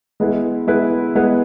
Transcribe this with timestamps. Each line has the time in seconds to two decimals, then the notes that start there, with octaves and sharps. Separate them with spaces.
0.20 G#3 B3 E4 G#4 B4
0.67 G#3 B3 E4 G#4 B4
1.15 G#3 B3 E4 G#4 B4